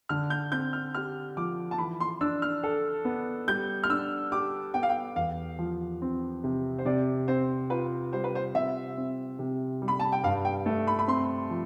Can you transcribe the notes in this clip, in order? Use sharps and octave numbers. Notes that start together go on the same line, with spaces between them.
D3 F6
G6
C4 G6
F6
G4 F6
F3 D6
A5
E3 B5
C6
D4 E6
F6
A4
B3
G3 G6
F6
D4 E6
G4 D6
B3 G5
F5
G5
E2 F5
F3
C4
C3
C5
C3 D5
C4 C5
F4 B4
G3 C5
B4
C5
C3 E5
C4
C3
G3
B5
A5
G5
G2 F5
G5
A3
B5
B5
C4 C6
F3